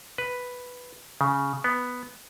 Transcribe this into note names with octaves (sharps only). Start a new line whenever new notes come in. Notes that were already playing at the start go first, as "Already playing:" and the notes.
B4
C#3
B3